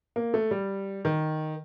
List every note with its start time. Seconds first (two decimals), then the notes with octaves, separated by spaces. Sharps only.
0.16 A#3
0.34 A3
0.51 G3
1.05 D#3